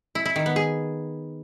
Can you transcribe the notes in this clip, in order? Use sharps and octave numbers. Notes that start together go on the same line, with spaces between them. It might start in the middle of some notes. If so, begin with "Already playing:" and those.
E4
E4
D#3
B3
G#4